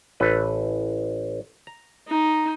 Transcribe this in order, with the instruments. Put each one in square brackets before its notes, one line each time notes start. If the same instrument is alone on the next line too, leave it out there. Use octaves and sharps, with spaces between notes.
[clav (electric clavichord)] A1 A4 B4
A#5
[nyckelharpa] D#4